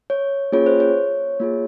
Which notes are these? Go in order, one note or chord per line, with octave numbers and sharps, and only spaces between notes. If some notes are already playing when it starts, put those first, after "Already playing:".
C#5
A#3 C#4 F4 G#4 C#5
C5
C#5
A#3 F4 G#4